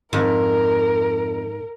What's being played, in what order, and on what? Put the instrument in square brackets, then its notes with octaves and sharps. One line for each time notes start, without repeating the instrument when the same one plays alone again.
[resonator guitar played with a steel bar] F2 [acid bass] G#2 [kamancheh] A#4